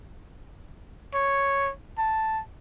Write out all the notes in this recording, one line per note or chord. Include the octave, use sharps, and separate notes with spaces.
C#5
A5